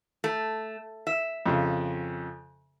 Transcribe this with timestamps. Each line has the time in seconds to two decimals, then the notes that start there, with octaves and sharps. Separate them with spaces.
0.24 A3
1.07 E5
1.46 F2 C#3